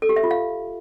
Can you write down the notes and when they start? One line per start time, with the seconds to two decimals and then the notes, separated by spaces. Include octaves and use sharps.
0.02 A4
0.09 G4
0.16 E5
0.24 F4
0.31 F5